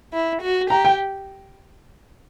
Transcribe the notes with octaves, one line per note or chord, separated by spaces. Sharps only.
E4
F#4
G4 A#5
G5